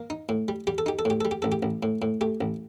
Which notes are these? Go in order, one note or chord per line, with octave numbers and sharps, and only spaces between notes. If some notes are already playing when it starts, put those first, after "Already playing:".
Already playing: A#3 A#4
D#4
A2
G3
G3 G4
A4
D#4 G4
A4
A2 G4
G3 A4
G4
A1 A4
G4
A1
A2
A2
A3 G4
A1